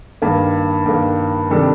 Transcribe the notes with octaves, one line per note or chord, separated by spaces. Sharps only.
G2 D#3 A#3
G2 D#3 A#3
C3 D#3 G3 D4 A4